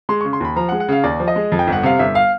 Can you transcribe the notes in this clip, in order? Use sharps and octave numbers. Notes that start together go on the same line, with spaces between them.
G#3 C6
C#3 C#6
C6
D#2 B5
F3 A#5
F#5
G#3
F#5
C#3 F5
D#2 D5
F3
D#5
G#3
F2
G5
G1
F#5
C3 F5
G1 E5
F5